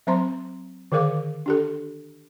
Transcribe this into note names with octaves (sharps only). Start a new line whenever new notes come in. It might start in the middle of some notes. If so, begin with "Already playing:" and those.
F#3 C4 C5 A#5 C6
D3 D#3 G#4 A#4 F5 D6
D4 G4 A4